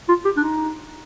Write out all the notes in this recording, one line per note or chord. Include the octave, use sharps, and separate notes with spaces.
F4
G4
D4
D#4